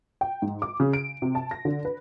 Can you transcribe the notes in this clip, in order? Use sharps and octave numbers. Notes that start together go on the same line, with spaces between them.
G5
G#2
D6
C#3
D7
C3
A5
A#6
D3
B4